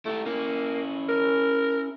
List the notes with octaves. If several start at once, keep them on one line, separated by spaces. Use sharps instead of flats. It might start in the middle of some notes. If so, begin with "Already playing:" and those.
A3 E4 G4
A#3 C#4 E4
A#4